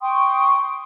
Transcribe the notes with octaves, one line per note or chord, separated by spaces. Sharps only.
G5 C6 C#6 D#6